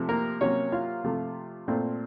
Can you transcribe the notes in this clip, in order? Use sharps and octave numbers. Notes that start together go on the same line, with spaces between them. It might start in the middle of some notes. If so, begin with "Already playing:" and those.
Already playing: C3 F3 A3
A#3 A#4
C3 F#3 A#3 C#4 C#5
F4 F5
C3 F3 A3
A#2 A3 C4